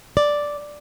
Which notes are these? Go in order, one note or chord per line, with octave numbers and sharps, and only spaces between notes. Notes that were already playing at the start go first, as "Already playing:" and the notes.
D5